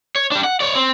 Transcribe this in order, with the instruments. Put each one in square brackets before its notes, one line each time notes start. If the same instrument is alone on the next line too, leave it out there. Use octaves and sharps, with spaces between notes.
[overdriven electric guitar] C#5
G3 D4
F#5
C#5 D5
C4